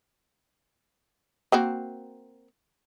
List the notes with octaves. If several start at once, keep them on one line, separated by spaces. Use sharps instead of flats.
A#3 C4 F#4